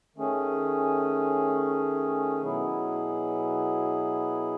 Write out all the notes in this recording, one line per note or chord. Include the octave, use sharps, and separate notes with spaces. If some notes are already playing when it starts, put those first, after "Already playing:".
D#3 A3 C#4 G#4
B2 F#3 B3 E4 G#4